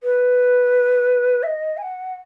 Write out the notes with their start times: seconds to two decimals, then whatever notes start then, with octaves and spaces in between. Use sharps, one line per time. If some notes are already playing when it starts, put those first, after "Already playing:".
0.03 B4
1.43 E5
1.46 D#5
1.77 G#5
1.82 F#5